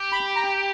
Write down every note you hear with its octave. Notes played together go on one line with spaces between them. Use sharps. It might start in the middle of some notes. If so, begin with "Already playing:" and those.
Already playing: G4
B5
A#5